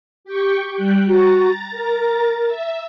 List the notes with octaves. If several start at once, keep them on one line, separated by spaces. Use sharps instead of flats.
G4 G5 C#6
G3 G5 F#6
F#4 A#5 A6
A#4
E5